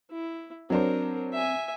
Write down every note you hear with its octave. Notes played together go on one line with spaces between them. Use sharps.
E4
F#3 C4 D4 A#4 C5
E5 G#5